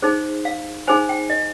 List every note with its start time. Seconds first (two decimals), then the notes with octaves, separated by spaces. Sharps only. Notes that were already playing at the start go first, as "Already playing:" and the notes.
0.02 D#4 G#4 C5
0.45 F5
0.87 D#4 G#4 C5 G#5
1.09 G5
1.30 D#5